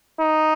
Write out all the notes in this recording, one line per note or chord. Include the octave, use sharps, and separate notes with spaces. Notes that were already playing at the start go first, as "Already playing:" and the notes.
D#4